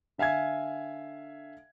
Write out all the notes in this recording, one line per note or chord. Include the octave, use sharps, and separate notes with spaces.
D3 E5 F5 G#5 G#6